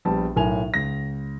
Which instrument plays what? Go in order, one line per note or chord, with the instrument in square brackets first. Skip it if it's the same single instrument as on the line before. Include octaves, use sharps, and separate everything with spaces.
[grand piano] A#1 G3 B3 A5
B1 A2 A#4 G#5 F7
C#2 A#6